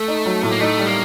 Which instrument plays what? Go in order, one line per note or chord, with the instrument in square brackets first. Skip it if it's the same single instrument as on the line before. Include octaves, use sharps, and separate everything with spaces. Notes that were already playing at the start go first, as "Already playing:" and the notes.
Already playing: [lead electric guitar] A3
[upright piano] D#4
F#3
A2
[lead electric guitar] A#3
[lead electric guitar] A3 [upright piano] D#4
[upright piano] G3
[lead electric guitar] A#3